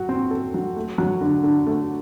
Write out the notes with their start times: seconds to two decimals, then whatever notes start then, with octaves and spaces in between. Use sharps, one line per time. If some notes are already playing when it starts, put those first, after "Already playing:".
Already playing: F#3 F#4
0.09 C4
0.31 A4
0.54 F#3
0.76 A3
0.98 F#3
1.21 D3
1.43 D3
1.67 A3